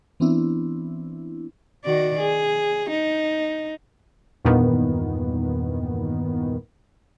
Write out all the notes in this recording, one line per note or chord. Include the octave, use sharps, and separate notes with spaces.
E3 B3 C4 D4 E4
D#3 F#4 D5
G#4
D#4
E2 G2 A#2 D#3 B3